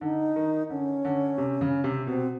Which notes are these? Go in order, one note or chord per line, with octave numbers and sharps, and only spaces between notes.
D3 D#4
D#3
D3 C#4
D3
C3
C#3
C3
B2 C4